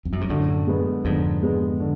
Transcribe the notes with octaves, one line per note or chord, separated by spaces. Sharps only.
F2
F#2
G#2
F#2 A2 D3
G#3 B3
F2 G#2 D3
G#3 B3
D3